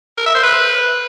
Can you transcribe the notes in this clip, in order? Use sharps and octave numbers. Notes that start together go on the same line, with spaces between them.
A#4
E5
C5
B4